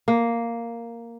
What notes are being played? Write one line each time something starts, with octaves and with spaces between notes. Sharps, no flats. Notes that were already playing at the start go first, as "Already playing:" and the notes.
A#3